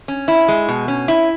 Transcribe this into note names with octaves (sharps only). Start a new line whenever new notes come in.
C#4
E4
G#3
B2
C#4
E4